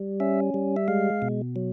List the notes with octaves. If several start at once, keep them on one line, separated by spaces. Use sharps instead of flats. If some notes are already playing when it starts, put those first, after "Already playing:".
Already playing: G3
C#4 E5
G3
E5
G#3 F5
B2
F#3